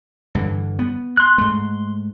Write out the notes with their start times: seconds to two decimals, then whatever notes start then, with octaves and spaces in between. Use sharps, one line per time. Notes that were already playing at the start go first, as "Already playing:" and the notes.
0.35 G2 D3 E3
0.79 B3
1.17 C6 F#6
1.38 G#2 A3